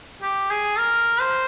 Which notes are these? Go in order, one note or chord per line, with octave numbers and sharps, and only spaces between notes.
G4
G#4
A#4
C5